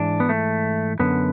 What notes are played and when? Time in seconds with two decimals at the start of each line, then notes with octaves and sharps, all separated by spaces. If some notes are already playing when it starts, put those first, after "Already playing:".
Already playing: G#2 E3 D4
0.20 B3
0.29 A3
0.99 F#2 D3 B3